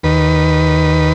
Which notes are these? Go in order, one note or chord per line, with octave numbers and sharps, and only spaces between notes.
D#2 D#3 B4